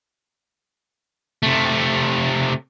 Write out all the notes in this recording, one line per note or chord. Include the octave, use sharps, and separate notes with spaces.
C3 A3